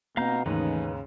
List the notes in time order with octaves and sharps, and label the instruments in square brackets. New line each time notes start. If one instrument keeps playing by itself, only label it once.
[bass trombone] B2 [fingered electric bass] A#3 C4 [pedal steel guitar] F5 A#5 G6
[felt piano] D#2 G#2 [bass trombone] C#3 [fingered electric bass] E3 A3 [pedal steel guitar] C#4 D#4 B4